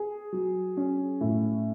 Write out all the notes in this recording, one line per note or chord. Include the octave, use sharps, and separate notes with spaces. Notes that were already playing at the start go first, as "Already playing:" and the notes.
Already playing: G#4
F#3
C#4
A2